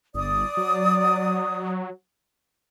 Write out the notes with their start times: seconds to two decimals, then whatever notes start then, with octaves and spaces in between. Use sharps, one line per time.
0.14 G1 D5 D#6
0.57 F#3